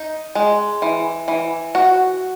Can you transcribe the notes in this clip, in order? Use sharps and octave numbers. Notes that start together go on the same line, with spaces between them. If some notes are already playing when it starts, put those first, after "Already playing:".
Already playing: D#4
G#3
E3
E3
F#4